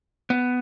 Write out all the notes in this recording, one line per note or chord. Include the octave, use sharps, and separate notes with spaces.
B3